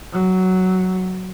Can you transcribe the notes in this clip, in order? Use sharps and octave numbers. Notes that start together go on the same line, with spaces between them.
F#3